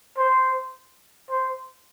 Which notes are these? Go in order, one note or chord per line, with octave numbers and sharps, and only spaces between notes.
C5
C5